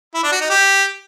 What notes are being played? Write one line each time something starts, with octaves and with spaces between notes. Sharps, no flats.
E4
D4
F#4
D#4
G4